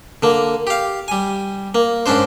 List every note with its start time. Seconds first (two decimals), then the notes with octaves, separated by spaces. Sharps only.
0.23 D3 A#3
0.67 G4 F5
1.08 G3 G#5
1.75 A#3
2.06 G#2 C#4 D4 C5